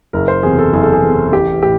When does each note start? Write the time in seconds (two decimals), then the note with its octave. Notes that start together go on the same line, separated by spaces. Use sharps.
0.13 F#1 A#4
0.28 C5
0.43 E2 C3 G#4
0.58 A4
0.73 F#1 G#4
0.83 A4
0.93 G#4
1.02 E2 C3
1.32 A1 G4
1.62 A2 G4